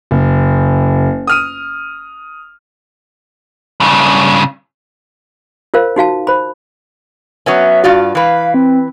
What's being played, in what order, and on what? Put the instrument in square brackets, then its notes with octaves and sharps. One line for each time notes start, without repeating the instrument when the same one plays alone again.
[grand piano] F#1
D#6 F6 D#7
[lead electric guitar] G2 C#3
[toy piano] F4 A#4 C5 F5
D#4 F#4 F5 A5
C5 B5
[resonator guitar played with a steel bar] F#3 B3 C#4 [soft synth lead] E5
[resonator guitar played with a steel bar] G2 F4 D5 [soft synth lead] F#4
[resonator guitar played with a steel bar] E3 B4 [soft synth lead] F5
[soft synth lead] C4